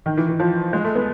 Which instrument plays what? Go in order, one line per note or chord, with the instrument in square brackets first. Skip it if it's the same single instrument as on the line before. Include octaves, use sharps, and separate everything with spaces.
[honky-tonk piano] D#3
E3
E3
F3
G#3
A3
B3